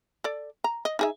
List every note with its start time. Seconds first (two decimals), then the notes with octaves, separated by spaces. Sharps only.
0.24 A4 D5
0.64 A#5
0.85 D#5
0.99 D#4 G#4 E5